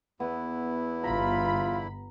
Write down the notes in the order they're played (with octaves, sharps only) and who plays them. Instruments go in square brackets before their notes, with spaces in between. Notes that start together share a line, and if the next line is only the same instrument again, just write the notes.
[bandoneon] E2 E4 [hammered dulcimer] B3
[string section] G1 B5 [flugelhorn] F4 [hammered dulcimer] A#5